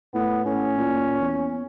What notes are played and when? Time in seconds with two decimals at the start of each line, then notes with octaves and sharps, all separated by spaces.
0.14 A2 B3
0.45 A2 C#4
0.78 A#2
1.21 E2